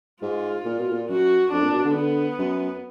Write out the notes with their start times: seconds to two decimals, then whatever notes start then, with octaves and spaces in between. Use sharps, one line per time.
0.22 G#2 F4
0.65 A#2
0.79 B2
0.92 A#2
1.09 F#2 F#4
1.52 F2 D4
1.62 A#2
1.73 B2
1.84 D3
1.95 D3 B3
2.39 F#2